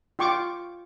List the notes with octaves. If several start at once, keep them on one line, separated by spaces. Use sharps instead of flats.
F4 G5 C#6 D6